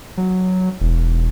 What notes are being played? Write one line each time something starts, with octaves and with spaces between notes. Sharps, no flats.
F#3
E1